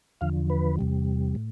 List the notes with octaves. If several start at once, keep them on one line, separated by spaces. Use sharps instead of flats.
E2 D3 F3 F5
B4
E2 C3 G3
A2